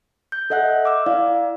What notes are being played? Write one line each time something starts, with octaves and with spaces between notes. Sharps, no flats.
G6
A4 D#5 E5 F#5 F#6
D6 E6
E4 D5 F5